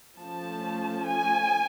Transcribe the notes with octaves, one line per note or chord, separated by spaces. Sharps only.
F3 A3 C#4 A5
G#5